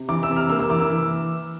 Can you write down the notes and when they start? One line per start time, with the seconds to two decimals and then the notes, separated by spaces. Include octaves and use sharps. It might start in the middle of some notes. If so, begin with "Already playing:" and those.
Already playing: C3
0.09 E3 D6
0.23 E6
0.29 C3
0.36 F6
0.50 A#3 E6
0.60 E6
0.70 E3 D6
0.80 E6
0.90 E3